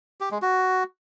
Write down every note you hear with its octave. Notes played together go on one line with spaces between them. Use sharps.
G4
G#3
F#4